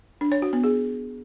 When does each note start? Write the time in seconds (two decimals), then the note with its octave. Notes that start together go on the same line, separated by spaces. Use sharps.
0.21 D4
0.32 C#5
0.42 F#4
0.53 B3
0.64 G#4